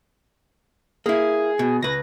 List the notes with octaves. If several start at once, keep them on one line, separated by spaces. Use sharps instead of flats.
A#3 E4 G#4
B2
C#2 B4 A#6